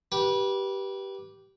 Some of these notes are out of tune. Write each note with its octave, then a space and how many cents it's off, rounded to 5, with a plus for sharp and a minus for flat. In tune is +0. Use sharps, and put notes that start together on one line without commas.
G4 -10 B4 -25